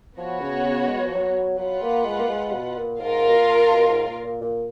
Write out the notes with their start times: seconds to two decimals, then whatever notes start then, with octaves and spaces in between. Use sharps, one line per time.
0.17 F3 B3 F#4 C#5
0.41 C#3
0.64 C#3
0.87 G#3
0.97 F#3
1.06 F3
1.15 F#3
1.58 F#3 F4 B4 F#5
1.82 A#3
2.05 G#3
2.19 A#3
2.29 G#3
2.53 B2
2.77 A#2
3.00 G#2 F4 A#4 F5
3.28 B2
3.35 A#2
3.71 B2
3.89 G#2
4.07 A#2
4.24 A#2
4.41 A#2